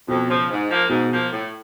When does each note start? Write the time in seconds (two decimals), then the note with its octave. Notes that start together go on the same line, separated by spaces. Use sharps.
0.08 F2 B2
0.29 C#3 F3
0.50 G#2
0.70 F3 A#3
0.89 G#2 B2
1.11 F3 A#3
1.31 A2